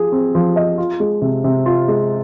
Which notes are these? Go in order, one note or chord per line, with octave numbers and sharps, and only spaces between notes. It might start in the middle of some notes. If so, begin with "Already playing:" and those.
Already playing: F3 G#4
C4
F3
D#5
F4
G#3
C3
C3
F4
G#3